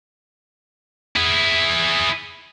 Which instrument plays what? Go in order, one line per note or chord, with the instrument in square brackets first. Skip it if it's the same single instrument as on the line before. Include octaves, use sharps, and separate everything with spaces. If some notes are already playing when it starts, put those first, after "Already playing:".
[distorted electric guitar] E4 G#4